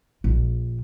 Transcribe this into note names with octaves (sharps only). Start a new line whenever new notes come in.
A#1